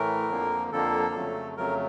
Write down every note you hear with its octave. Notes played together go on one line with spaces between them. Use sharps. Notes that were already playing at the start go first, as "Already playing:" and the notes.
Already playing: A2 E3 A3 A#4
F2 D3 F3 A#3
F2 D3 F3 A#3 A4
F2 C#3 F#3 A3
F2 C#3 F#3 A3 A#4